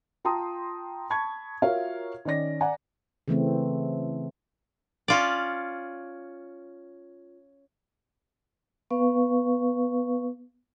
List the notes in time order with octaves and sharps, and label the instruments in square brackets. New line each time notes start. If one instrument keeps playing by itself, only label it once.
[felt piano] F4 G5 A5 A#5 C6 D#6
A5 B5 C#6 G#6
F4 F#4 A#4 C#5 E5 F5
D#3 C#4 D5 A#6
D5 F#5 G#5 A#5
[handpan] C#3 E3 A3 C4
[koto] C#4 F4 D5
[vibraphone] B3 B4 F5 C#6